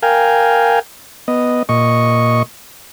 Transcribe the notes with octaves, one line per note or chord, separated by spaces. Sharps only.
A#4 F5 G5 G#5
B3 D#5
A#2 D#5 C#6